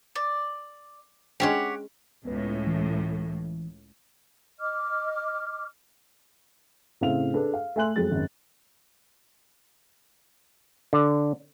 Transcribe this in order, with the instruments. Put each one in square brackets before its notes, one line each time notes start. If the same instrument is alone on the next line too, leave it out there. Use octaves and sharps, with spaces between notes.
[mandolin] D5
[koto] G#3 C#4 D4 [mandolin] G4 C#5 F#5
[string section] C#2 A2 [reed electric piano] B3 B4
[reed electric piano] E3
[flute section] D#5 D6 F6
[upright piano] A2 C#3 C4 F5 F7
D4 G#4 A4 B4
F5
A3 E5 G#5 C6 F#6 F#7
F2 F#3 G#3 A6
G#1 F#2
[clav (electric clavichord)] D3